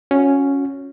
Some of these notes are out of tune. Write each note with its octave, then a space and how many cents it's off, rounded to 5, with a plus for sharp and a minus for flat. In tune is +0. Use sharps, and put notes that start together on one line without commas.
C#4 +0 F#4 -30